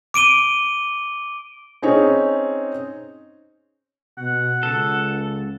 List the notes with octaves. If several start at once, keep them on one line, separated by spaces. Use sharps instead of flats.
D6 D7 D#7 G7
C4 C#4 D#4 G#4 C#5
B2 F#5
C#2 A4